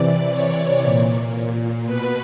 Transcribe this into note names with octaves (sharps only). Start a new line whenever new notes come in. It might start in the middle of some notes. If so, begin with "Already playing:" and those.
Already playing: C3 E3 D5
C#5
A#2
B2 B4